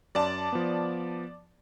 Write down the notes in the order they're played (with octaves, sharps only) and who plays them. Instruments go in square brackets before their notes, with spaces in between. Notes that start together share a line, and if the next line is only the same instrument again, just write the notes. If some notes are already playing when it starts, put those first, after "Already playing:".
[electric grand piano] F#2 [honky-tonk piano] D5 A5
[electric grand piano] F3 B3